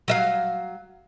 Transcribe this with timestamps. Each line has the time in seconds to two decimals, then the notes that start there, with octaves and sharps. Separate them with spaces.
0.08 F#3 E5 F5